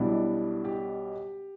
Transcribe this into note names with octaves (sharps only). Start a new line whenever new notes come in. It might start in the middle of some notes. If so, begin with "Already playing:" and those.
Already playing: B1 B2 G3 D4 E4
G4